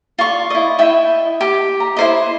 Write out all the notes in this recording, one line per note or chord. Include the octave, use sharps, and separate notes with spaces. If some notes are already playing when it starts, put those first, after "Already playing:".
F4 D5 C#6
E4 D#5
E4 D#5 E5 G5
G4
A#5
E4 C5 D#5